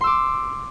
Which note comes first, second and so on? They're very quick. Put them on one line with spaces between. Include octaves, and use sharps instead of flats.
C6 E6 D6